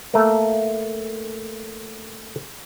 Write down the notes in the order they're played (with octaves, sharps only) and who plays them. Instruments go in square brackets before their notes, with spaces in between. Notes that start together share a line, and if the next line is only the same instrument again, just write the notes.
[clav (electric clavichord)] A3 A#3